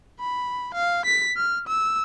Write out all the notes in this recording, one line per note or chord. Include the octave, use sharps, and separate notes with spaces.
B5
F5
B6
F6
E6